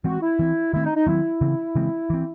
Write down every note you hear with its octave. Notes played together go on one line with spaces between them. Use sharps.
E3 G#3 C4 F#4
E4
E3 C4
D#3 A3 C4 E4
D#4
D#4
D#3 F#3 C4 E4
C#3 E3 C4
C#3 E3 G#3 C4
E3 C4